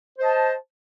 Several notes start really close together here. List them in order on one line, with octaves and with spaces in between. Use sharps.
C5 D#5 A5